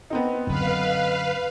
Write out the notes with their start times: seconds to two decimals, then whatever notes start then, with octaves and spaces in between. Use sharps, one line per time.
0.10 B3 C4 D#4
0.47 F#2 D3 B4 F5